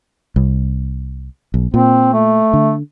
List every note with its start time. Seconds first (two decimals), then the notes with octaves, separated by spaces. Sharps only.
0.36 C2
1.54 B1
1.74 A#2 C4
2.13 A3
2.53 D3